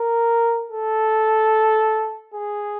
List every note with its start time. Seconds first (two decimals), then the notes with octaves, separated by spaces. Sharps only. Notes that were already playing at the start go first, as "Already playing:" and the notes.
Already playing: A#4
0.70 A4
2.34 G#4